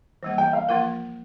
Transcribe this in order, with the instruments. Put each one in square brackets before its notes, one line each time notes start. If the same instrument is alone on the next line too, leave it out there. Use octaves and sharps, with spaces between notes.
[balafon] E3 G3 A#3
[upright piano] G5
F5
[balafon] F3 A#3 F4 A#4